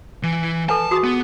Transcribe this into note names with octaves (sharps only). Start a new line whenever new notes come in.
E3
A4 B4 G#5 A5
F#4 G#4 D#6
B3